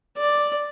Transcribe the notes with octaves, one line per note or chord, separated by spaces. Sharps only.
D5